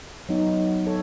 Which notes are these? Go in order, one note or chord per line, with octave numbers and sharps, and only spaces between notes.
F#3 B3 D#4
A4 C#5